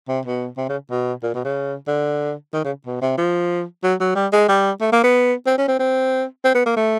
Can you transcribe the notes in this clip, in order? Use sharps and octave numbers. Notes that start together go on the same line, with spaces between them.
C3
B2
C3
C#3
B2
A#2
B2
C#3
D3
D#3
C#3
B2
C3
F3
F#3
F#3
G3
G#3
G3
A3
A#3
B3
C4
C#4
C4
C4
C4
B3
A#3
A3